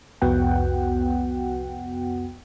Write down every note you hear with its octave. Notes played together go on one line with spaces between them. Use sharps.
C2 F2 B3 F#4 F#5 G5